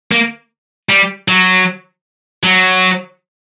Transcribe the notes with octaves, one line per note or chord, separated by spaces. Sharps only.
A#3
G3
F#3
F#3